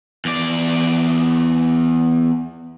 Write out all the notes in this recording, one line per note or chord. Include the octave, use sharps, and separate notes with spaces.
E2 D5